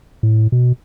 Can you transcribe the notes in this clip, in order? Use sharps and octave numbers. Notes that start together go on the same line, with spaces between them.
A2
B2